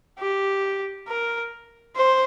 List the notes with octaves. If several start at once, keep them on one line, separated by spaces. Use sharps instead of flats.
G4
A#4
C5